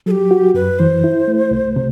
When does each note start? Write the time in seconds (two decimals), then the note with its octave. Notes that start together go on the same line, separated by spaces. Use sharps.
0.06 F#3 A4
0.11 G4
0.31 F#4
0.54 F#2 B4
0.79 E3 C5
1.04 E4
1.27 A3
1.51 C2
1.76 C3